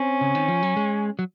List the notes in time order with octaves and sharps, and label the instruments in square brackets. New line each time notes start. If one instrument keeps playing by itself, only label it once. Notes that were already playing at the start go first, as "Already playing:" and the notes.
Already playing: [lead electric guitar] C4 [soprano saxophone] C#4
[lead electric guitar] C#3
D#3
F3
F#3
G#3
F#3